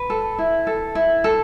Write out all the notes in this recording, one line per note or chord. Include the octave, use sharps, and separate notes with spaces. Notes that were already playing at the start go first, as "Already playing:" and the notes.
Already playing: B4
A4
E4
A4
E4
A4